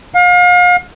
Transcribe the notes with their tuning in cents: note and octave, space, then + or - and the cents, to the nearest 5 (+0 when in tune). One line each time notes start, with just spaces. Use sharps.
F5 +35